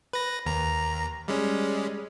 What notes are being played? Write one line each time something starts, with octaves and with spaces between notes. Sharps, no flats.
B4 A#6
D#2 A#5
G3 G#3 C#4